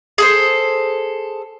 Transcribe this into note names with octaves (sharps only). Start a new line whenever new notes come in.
G#4 A4 C5